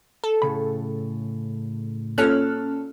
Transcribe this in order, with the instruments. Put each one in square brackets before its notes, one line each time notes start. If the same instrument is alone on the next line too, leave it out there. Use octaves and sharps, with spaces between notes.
[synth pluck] A4
[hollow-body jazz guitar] A2 C#3 B5
[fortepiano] A#2 A4 F#6 [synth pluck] C#4 F6